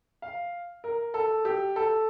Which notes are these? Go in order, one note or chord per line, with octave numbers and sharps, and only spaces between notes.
F5
A#4
A4
G4
A4